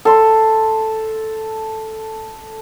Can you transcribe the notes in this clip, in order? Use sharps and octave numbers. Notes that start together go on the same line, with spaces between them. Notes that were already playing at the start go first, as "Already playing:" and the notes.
A4 C6